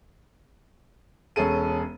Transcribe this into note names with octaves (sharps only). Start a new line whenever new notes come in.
E1 C#4 G#4 A4 D#7